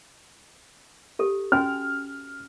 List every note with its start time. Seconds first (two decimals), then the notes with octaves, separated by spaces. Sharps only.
1.19 G4 A4
1.52 C#4 F#4 G#5 F6